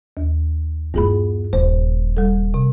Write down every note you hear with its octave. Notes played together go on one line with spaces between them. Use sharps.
D#2
G2 B3 E4 G#4 B5
D#1 C5
G3 A4
C3